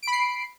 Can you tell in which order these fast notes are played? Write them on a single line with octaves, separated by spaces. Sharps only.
D7 B5 C7